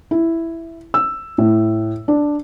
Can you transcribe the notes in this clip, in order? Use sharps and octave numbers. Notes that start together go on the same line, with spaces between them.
E4
E6
A2
D4